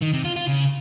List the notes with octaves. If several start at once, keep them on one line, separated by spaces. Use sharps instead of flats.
D#3
C3
F4
F4
C#3